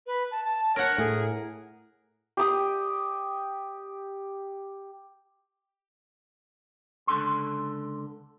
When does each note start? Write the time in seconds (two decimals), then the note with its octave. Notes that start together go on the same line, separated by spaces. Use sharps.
0.06 B4
0.31 A5
0.45 A5
0.76 A#4 C#5 F#5
0.98 A2 G#4
2.37 G4 G5 D#6
7.07 C#2 D3 A4 C6